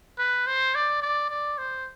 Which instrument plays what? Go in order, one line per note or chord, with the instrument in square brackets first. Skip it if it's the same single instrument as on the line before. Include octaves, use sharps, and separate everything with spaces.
[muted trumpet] B4
C5
D5
D5
D5
C5